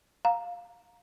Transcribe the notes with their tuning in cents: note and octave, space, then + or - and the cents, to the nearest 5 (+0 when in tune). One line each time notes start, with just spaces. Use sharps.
F5 +10 A#5 +0